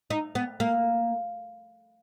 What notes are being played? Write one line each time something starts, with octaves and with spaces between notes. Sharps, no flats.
D#4
B3
A#3